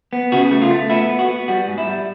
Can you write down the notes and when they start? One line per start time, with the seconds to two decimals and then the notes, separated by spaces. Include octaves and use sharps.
0.13 B3
0.32 C#3 F#4
0.52 A3
0.62 F4
0.71 A3
0.90 B3 E4
1.09 B3
1.19 F#4
1.28 B3
1.48 G3 F#4
1.68 G#2
1.78 E4
1.87 G3